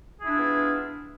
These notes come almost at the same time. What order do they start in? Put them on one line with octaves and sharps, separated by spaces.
G#4 E4 D4 F4 B3